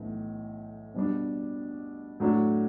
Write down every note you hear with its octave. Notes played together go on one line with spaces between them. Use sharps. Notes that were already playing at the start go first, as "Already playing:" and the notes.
Already playing: B1 A2 E3
B2 G3 D4
A2 F#3 A3 D4